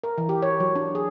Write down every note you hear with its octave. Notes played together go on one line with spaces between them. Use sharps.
A#4
E3
G4
C#5
F#3
D4
G#4